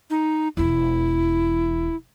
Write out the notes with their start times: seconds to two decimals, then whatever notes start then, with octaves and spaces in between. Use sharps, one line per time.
0.10 D#4
0.57 E1 E2 E4